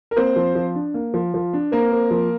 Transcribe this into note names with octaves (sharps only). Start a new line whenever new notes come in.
A#4
A#3 C4 C5
F3
F3
D4
A#3
F3
F3
D4
A#3 C4 A#4
C4
F3